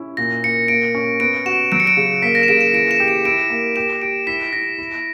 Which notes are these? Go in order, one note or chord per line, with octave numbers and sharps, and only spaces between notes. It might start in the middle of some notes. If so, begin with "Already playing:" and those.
Already playing: C#4 E4
A#2 A#6
A#3 C#7
A#3 D7
C#4
B3 D7
F#4 E7
F#3 D7
C#7
D7
C#3
A#3 B6
A#6
E7
C#3 D7
E7
E3 D7
E7
G4
D7
E4 D7
A#3
G4 E7
G4 D7
E4 B6
E4 A#6
E4